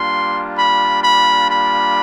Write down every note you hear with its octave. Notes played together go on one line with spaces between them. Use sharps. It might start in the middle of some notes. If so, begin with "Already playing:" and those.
Already playing: G3 A#3 D4 F4 C6
B5
B5
B5